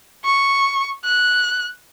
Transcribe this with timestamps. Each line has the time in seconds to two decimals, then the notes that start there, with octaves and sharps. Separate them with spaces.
0.25 C#6
1.05 F#6